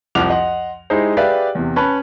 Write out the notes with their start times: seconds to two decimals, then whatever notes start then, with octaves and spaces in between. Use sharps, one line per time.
0.15 C2 F2 F3 F#5 D6 F7
0.30 D#5 F#5 C6
0.90 G#3 D#4 E4 G4 G#4 C5
1.17 G4 G#4 B4 D5 E5 F5
1.55 E2 C3
1.76 C#4 B4 A5 B5